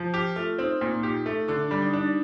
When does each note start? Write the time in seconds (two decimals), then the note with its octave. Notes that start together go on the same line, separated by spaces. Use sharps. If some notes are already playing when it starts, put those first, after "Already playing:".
Already playing: F3
0.14 F4 G4
0.36 A3 F4
0.58 C4 D#4
0.81 A#2
1.03 G4
1.26 A3
1.48 D3 D4
1.71 G3
1.82 D#4
1.93 D4